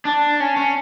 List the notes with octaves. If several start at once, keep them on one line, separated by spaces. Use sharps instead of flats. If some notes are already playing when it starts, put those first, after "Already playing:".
D4
C#4
C#4